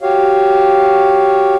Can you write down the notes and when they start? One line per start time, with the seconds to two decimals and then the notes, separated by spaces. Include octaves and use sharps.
0.01 F#4 G4 C#5 F5